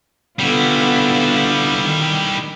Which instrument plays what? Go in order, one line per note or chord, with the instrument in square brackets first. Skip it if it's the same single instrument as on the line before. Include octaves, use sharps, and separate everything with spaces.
[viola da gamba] D3 B3 F4 [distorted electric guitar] G3 E4
[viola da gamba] D#3